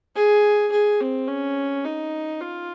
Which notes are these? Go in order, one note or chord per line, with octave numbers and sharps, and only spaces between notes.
G#4
G#4
C4
C#4
D#4
F4